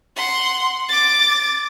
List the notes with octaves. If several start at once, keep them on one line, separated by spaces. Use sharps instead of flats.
F#5 C6
D6 A6